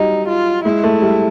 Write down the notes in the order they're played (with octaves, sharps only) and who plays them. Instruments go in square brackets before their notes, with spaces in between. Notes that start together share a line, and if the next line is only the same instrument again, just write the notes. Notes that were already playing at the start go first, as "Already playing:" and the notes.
Already playing: [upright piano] F#3 G3 [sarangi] D#4
[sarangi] F4
[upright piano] G#3 [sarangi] E4
[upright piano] A3
G3